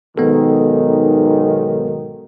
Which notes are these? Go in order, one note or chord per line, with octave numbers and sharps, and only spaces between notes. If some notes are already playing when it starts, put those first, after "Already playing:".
B1 G#2 D#3 B3 A4